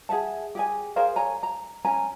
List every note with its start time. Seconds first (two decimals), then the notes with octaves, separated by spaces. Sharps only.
0.09 G#4 E5 F#5 A5
0.55 G4 G#4 G#5
0.96 G#4 A#4 C5 F5
1.16 C#5 G#5 A#5
1.43 A#5
1.85 C#4 G#5 A#5